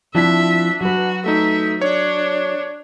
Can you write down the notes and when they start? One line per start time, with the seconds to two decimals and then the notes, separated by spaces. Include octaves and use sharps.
0.15 F3 C4 D4 E4 E5 B6
0.81 F#3 F#4 B4
1.26 A3 D#4 E5
1.81 D4 C#5